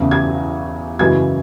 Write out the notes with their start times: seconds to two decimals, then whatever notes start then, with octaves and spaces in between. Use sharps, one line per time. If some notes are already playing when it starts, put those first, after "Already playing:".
Already playing: E2 C#3 E3 A3
0.11 G#6
0.99 F#2 C#3 E3 G#3 G#6